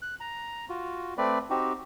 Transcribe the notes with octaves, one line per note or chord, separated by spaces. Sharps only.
F#6
A#5
F4 F#4
A3 C4 B4 D5
C4 D#4 F#4 G4